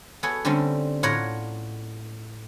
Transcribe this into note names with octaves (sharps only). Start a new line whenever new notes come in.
B3 F#4 G#4 A4 C#5
D3 G3 A3 C4 C#4
A2 F4 C#5 D5 F#5 A#5